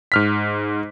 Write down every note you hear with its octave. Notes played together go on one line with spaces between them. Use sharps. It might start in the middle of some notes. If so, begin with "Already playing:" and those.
G#2 F6 B6